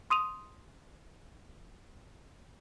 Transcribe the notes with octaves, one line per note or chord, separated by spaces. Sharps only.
C6 D#6 D#7 F7